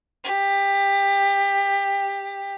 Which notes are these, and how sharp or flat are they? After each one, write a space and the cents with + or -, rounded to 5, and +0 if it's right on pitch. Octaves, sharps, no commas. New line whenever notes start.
G4 +20